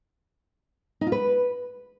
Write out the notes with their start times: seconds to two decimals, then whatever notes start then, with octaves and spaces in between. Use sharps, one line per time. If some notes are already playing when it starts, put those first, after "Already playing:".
1.01 D#4
1.07 F4
1.12 B4